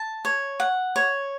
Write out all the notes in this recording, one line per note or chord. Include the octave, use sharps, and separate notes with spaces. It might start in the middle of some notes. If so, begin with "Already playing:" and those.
Already playing: A5
C#5
F#5
C#5